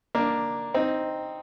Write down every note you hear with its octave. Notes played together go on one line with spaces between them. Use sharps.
A#3 D4
C4 D#4